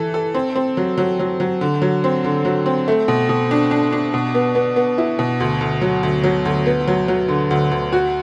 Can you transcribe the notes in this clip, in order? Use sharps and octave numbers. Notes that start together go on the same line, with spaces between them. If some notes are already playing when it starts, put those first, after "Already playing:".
Already playing: E3 A4
A4
C4
C4
F#3
F#3
F#3
F#3
D3
F#3
C4
D3
F#3
C4
A3
B2
B2
D4
D4
D4
B2
B3
B3
B3
E4
B2
D2
D2
F#3
D2
F#3
D2
B3
F#3
F#3
D3
D2
D2
F#4